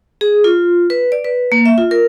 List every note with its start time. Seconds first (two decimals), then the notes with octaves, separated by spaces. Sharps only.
0.21 G#4
0.44 F4
0.90 B4
1.12 D5
1.24 B4
1.52 A#3
1.66 E5
1.78 F4
1.91 A#4